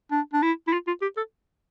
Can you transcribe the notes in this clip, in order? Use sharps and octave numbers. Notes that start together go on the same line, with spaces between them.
D4
D4
E4
E4
F4
F4
G4
A4